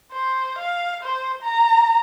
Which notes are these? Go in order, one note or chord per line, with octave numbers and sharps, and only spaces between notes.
C5
F5
C5
A#5